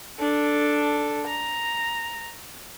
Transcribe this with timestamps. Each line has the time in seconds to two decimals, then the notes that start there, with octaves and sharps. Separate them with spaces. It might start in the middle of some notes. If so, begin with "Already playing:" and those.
0.20 D4 A4
1.27 A#5